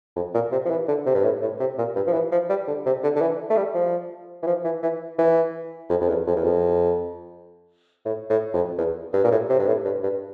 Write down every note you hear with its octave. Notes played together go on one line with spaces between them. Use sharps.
F2
A#2
C3
F3
E3
D3
C3
G2
A2
A2
C3
A#2
G2
F3
E3
F3
G3
D3
C3
D3
D3
E3
A3
G3
F3
E3
F3
E3
E3
E3
F2
F2
E2
F2
E2
F2
A2
A2
F2
E2
G2
A#2
A2
C3
G2
A2
G2
G2